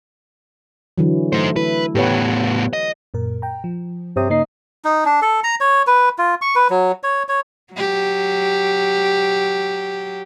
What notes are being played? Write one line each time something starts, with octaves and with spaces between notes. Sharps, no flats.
D3 E3 F#3
A3 D#4 C5
E4 B4
A2 B3 G4 B4 C#5
D#5
F#2 A#2 A#4
G5 A#5
F3
G2 C3 C#5 D#6
C#3 A#3 D#4 C7
D#4
D4
A4
A#5
C#5
B4
F4
C#6
B4
F#3
C#5
C#5
F#3 G4